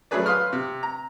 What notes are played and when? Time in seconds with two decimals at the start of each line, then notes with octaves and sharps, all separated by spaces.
0.11 F#3 A3 C#4 G#4 B4 D5
0.26 B4 F5 C6 D#6 F6
0.53 C3
0.83 A#5